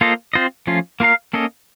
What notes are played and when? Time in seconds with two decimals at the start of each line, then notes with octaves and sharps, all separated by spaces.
0.01 A#3 F4 A4 C5 D#5
0.33 C4 F4 C5 D#5
0.67 F3 A3 C#4 F4
1.00 A#3 F4 A#4 F5
1.33 A#3 C#4 A4 D#5